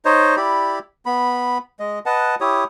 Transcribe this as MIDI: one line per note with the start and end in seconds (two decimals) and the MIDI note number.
0.05 0.36 63
0.05 0.36 72
0.05 0.36 73
0.05 0.36 75
0.37 0.79 64
0.37 0.79 67
0.37 0.79 74
0.37 0.79 83
1.06 1.58 59
1.06 1.58 83
1.80 1.99 56
1.80 1.99 75
2.06 2.35 71
2.06 2.35 75
2.06 2.35 78
2.06 2.35 81
2.41 2.64 64
2.41 2.64 67
2.41 2.64 73
2.41 2.64 87